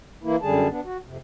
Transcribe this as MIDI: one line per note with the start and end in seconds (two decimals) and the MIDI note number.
0.23 0.36 52
0.23 0.36 58
0.23 0.36 64
0.42 0.68 42
0.42 0.68 50
0.42 0.68 55
0.42 0.68 68
0.42 0.68 81
0.70 0.81 59
0.70 0.81 62
0.85 0.97 66
1.05 1.18 41
1.05 1.18 48